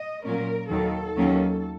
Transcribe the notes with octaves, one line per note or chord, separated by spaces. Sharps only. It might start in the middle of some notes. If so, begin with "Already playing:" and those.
Already playing: D#5
A#2 F#3 A#3 C#4 A#4
D#2 D#3 F#3 A4
D#2 D#3 F#3 A#3 C#4